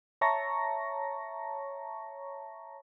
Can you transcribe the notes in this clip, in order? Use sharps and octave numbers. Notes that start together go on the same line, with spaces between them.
C#5 E5 A5 A#5 C#6 A#6